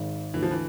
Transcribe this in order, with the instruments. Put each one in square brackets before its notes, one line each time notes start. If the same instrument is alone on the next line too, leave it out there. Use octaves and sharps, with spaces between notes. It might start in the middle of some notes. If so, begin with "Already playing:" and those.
Already playing: [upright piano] G#1 G#2
[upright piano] D2 [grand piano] E3
[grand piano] F3
E3